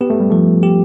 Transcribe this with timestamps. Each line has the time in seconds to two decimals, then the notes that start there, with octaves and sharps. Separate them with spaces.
0.01 B3 G4
0.10 A3
0.20 G3
0.30 F3 A3
0.63 G4